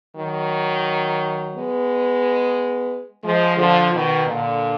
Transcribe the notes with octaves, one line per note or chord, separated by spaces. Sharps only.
D#3 F#3
G#3 B3
F3 G#3
D3 F3
B2 D#3
A#2 D3